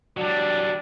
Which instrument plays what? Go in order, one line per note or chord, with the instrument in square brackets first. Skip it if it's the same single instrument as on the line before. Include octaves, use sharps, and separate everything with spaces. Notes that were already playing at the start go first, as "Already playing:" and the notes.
[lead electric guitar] F#3 G3 [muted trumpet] D4